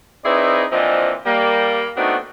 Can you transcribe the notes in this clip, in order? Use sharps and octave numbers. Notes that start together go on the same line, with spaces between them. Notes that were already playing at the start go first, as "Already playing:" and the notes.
C4 D#4 E4 G#4 B4 D5
A#2 E3 F3 C4 D4 D#5
G3 A#3
A3 B3 C4 D4 D#4 F#4